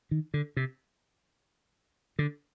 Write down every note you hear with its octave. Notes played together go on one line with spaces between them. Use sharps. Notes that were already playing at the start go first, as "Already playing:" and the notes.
D#3
D3
C3
D3